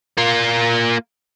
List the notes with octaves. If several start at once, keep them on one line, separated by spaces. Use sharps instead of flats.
A#3 F4